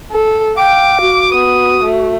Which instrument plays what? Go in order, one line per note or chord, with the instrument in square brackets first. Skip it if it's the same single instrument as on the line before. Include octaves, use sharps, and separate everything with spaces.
[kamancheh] A4
[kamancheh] F5 [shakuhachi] G5 [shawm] D6
[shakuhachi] F#4
[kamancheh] B3 [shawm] D#6
[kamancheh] A3